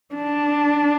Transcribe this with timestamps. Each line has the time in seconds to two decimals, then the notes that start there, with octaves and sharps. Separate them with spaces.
0.15 D4